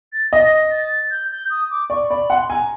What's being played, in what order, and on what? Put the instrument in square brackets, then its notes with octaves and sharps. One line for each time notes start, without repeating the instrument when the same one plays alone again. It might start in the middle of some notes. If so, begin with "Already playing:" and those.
[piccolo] A6
[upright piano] D#5 [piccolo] A#6
[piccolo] A6
G6
G6
D#6
D6
[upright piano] D5 [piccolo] C#6
[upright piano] D5 [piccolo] B5
[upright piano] F#5 [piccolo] C6
[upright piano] G#5 [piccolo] A#5